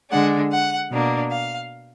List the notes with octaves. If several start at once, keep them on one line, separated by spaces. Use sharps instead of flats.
D3 G#3 D4 F#5
F#5
B2 A#3 D4
F5